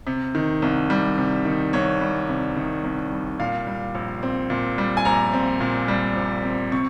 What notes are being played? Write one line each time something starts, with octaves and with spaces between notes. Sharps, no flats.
C3
D#3
C2
G3
C3
D#3
C2 C#5
G3
C3
D#3
C2
G3
A#2 F5
G3
A#1
C4
A#2
G3
G#5
A#1 A#5
C4
A#2
G3
A#1
C4
C3 C#6